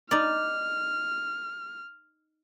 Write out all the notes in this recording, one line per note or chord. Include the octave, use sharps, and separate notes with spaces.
D#4 D5 F6